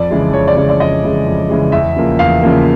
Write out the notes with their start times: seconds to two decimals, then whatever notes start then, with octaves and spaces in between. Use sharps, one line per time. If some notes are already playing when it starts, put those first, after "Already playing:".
Already playing: F2 D5
0.10 C#3 E3 G#3
0.33 F2 C#5
0.48 D5
0.56 C#3 E3 G#3 C#5
0.69 D5
0.80 F2 D#5
1.04 C#3 E3 G#3
1.26 F2
1.49 C#3 E3 G#3
1.72 E2 E5
1.96 C#3 F3 A#3
2.19 E2 F5
2.42 C#3 F3 A#3